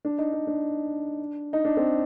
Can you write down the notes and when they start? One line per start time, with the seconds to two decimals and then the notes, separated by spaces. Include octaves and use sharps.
0.05 D4
0.18 D#4
0.33 D4
0.47 D4
1.53 D#4
1.65 D4
1.77 C4